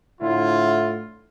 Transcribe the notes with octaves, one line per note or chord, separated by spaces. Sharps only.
A2 D3 E4 F4